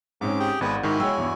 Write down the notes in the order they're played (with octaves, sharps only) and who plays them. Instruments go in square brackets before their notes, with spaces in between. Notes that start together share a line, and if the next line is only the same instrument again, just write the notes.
[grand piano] G#2 C4 C#4 [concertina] D6
[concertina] G4 G#4 G5
[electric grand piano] G#1 [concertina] G#3 B3 B4 [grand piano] F#5
[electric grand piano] G#2 D#3 [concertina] E4 F#4 G#5
[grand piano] G#3 G5 [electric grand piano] C#5 E6
[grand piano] E2 G2